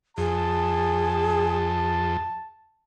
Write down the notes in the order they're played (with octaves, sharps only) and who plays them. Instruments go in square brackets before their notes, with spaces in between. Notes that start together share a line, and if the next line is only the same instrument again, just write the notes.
[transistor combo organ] F2 [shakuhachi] G#4 [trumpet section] A5